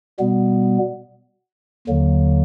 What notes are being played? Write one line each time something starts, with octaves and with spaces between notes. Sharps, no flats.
B2 G3 B3
D#2 D3 F#3 A#3